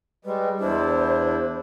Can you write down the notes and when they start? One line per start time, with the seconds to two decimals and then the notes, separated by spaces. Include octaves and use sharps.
0.25 G3 G#3 B4
0.60 E2 D4 E4 C5